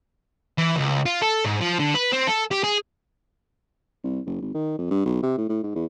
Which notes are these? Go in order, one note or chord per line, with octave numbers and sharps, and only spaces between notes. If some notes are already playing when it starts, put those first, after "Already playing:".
E3
C#2
F4
A4
G#2
F3
D3
B4
C4
A4
G4
G#4
C2
F#1
G#1
D#3
F2
G2
B1
C3
A2
A2
G#2
E2